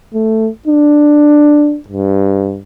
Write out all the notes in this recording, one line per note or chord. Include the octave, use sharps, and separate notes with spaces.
A3
D4
G2